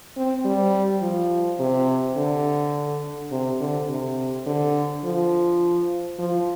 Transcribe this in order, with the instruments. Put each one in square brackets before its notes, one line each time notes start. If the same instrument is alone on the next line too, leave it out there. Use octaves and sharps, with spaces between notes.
[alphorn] C4
G3
F3
C3
D3
C3
D3
C3
D3
F3
F3